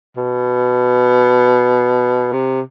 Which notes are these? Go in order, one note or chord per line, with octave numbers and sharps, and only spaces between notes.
B2
C3